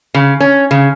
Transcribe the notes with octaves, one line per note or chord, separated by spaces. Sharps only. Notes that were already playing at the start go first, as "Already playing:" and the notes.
C#3
C#4
C#3